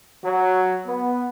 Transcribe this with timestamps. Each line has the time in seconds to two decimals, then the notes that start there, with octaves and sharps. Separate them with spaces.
0.24 F#3
0.86 B3